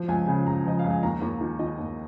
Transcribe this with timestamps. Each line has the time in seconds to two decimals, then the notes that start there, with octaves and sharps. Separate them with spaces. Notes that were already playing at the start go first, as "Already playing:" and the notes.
Already playing: F3
0.08 C#2 G#5
0.27 C#3 G#5
0.46 C#2 A#5
0.66 F3 D#5
0.79 C#2 F5
0.91 G#5
1.03 D#2 A#5
1.21 D#2 A#5
1.41 D#3
1.59 D#3 D#5
1.79 D#2